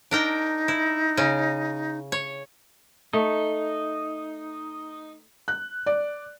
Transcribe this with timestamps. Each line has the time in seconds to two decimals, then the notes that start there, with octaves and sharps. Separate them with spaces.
0.11 D4 D#4 A#4 G5
0.68 E4
1.17 C#3 C#4
2.12 C#5
3.13 A3 D#4
5.48 F#6
5.86 D5